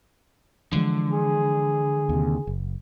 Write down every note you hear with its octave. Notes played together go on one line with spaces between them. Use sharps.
D3 E3 F3 G#3
G#4
D#2 C3
F#1